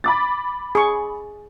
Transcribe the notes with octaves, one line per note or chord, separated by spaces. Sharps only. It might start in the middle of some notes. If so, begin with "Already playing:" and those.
B5 D6 A6
G#4 C#6